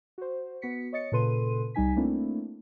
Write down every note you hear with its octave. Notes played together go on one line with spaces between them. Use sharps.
F#4 C5
B3 F#4 B6 C#7
C#5 D#5 A6 C#7
A#2 C#3 A4 B4 C6 D#7
C2 G3 D#4 G#5 B6
A3 A#3 C4 D4 E4